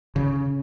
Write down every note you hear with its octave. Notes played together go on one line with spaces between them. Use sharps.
C#3